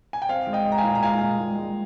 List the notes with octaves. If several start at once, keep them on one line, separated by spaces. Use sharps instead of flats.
G#5
G5
C4 F5
G#3
D#5 G5
G#3
A#5
F5 G#5
A#2
A#5
G#3 F5 G#5
A#2
G#3
G#3